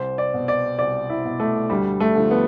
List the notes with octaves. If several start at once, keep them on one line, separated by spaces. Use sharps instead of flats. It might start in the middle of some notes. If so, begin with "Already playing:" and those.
Already playing: C2 C5
D5
B2
D5
C2 D5
E4
B2
A3
D2 G3
A3
D3 F3
B3